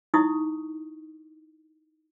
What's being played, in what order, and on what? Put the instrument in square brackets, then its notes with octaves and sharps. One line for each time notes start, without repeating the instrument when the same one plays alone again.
[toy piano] D#4 E4 C#6 D#6